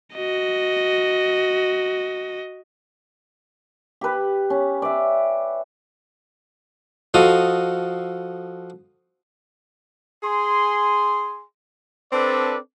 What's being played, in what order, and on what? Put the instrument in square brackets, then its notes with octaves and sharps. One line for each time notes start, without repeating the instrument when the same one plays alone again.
[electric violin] F#4 D#5
[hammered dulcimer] G4 B4
C#4
D5 E5
[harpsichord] F3 F#4 A4 D#5 F5 D#6
[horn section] G#4 G#5 C6
C4 D4 A4 B4 D5